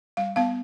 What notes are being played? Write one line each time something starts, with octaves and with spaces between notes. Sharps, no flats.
G3 F5
B3 F5